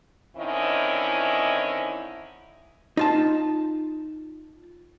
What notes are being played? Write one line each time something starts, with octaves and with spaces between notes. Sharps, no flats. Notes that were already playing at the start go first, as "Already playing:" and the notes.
D3 D#3 C4 C#4 E4 D#5
D#4 F4 A5